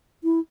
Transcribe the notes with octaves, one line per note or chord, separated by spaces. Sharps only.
E4